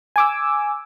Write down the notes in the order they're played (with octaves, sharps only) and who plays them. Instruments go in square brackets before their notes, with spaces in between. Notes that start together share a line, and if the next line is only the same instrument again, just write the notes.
[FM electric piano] G#5 D6 E6